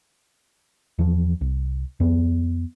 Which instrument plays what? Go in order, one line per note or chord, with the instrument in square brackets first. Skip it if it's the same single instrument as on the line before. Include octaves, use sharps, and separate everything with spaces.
[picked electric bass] E2 F3
C2
F2 B3